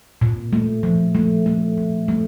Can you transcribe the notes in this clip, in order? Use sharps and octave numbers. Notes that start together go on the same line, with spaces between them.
A#2
A3
F3
A3
A3
A#2
A3